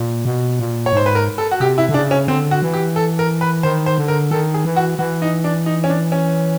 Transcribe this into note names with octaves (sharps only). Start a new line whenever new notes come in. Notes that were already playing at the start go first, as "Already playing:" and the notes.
Already playing: A#2
B2
A#2
C#5
G#2 C5
B4
A#4
A4
F#4
C3 G4
E4
D3
C#3 D4
C#4
D3 C4
F#4
E3
G4
A4
A#4
B4
D#3 C5
C5
D3
A#4
D#3 A4
G#4
E3
F#4
E3 F#4
D#4
D4
D#4
C#4
D4
C#4